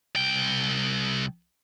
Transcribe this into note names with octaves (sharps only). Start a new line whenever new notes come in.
C2 G5